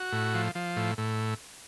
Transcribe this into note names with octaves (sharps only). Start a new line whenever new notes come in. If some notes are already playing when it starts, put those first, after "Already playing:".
Already playing: F#4
A2
F3
F3
A2
A2